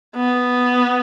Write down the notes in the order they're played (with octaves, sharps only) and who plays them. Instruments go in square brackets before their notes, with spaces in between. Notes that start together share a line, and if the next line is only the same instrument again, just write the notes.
[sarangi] B3